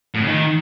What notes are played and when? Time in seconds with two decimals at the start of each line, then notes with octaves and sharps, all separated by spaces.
0.14 A2
0.21 C#3
0.27 D#3